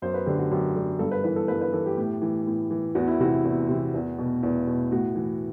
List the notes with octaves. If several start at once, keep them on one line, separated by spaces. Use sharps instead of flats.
F#2 C5
B4
D3 G4
F#4
F#2 G4
D3
G2 A4
B4
E3 B4
A4
G2 B4
B4
E3 A4
G4
A2
E3
A2
E3
E2 F#4
E4
C3 E3 F#4
E2
C3 E3
E2
B2
E2
B2
A2 F#4
E3